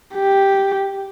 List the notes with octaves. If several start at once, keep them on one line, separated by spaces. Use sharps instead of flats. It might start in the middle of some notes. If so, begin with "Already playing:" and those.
G4